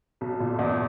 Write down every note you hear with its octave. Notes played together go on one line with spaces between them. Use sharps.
B1
A#2
E2